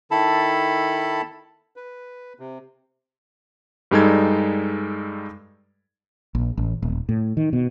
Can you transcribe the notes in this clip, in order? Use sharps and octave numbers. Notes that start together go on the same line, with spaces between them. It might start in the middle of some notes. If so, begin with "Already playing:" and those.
D#3 E4 A4 A5 B5
B4
C3
G2 G3 G#3 D#4 A4 G#6
A#1
A1
D#1
A2
D#3
B2